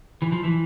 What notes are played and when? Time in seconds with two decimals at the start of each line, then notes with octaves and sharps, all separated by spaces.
0.22 E3
0.32 F3
0.44 E3